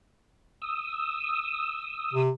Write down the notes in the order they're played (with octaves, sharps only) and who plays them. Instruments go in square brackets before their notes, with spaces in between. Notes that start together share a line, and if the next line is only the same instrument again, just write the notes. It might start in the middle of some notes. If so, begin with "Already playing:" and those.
[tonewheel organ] D#6 E6
[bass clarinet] C3